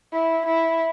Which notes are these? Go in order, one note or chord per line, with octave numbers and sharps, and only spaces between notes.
E4
E4